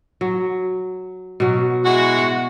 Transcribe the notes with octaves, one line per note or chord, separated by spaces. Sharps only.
F#3
B2 F#3
G#3 E4 F#4
F#5